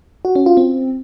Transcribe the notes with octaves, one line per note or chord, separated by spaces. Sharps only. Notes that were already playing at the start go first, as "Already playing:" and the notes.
F#4
C#4
F4
C4